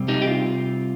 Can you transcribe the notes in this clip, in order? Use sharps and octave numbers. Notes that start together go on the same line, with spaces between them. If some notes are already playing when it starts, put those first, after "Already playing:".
Already playing: C3 G3 C4
D#4 G4
G4
F4